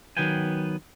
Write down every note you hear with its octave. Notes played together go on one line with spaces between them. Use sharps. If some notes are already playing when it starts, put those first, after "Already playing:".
D#3 F#3 B3 B4 G5 G#5